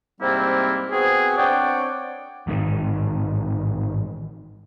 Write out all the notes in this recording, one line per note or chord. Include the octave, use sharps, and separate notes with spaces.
G#2 C3 G3 A#3 C4 E4
B3 C4 F#4 G#4
C4 D4 C#5 D5 F#5 G5
A1 G#2 C3 D#3